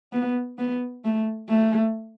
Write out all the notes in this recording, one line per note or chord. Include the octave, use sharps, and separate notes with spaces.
B3
B3
A3
A3